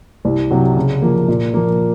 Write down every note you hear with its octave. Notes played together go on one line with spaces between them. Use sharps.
C2
C3 F#3
C#3
F3 A#3
A#2
F3 A#3